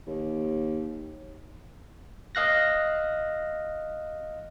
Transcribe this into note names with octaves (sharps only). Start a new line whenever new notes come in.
D#2
D#5 F5 F#6 A#6